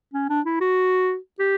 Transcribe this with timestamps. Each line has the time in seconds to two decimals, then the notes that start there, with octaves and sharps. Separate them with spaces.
0.14 C#4
0.30 D4
0.46 E4
0.61 F#4
1.39 G4